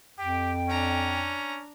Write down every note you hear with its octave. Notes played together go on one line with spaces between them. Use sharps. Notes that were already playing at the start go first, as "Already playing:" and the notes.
F2 G4 G5
C#4 D4 A#5